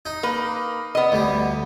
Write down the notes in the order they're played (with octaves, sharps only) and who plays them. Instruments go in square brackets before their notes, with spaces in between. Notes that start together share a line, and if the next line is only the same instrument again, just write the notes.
[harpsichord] D#4
[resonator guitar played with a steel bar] A#3 B4
B3 D#5
[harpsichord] D2 G3